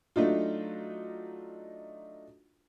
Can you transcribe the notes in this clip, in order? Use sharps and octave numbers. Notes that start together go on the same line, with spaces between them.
F#3 A3 D4 D#4 F4